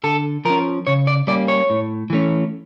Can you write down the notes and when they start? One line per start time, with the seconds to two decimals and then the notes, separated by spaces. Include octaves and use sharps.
0.04 D3 A4
0.45 F3 C#4 A#4
0.87 C#3 C#5
1.07 D5
1.27 G3 A#3 C#4 D5
1.48 C#5
1.70 A2
2.10 E3 A3 C#4